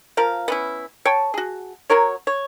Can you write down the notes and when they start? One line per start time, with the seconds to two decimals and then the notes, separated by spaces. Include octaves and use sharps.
0.17 F3 A#4 F5
0.48 B3 C#4 E4
1.05 C#5 G5 A5
1.34 F#4 G#4
1.90 F#3 F#4 A#4 C#5
2.27 C#5